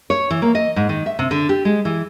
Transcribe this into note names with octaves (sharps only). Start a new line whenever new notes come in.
C#5
E3
A#3
D#5
G#2
D#3
E5
C3
D3
G4
G#3
E3